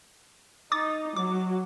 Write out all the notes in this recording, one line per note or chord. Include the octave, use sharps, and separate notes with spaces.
D#4 D6 D#6 A6
F#3 D6